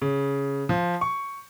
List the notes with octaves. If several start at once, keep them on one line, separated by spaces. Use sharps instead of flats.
C#3
F3
C#6